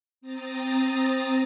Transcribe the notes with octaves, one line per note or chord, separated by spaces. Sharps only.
C4 A#5 D#6 A6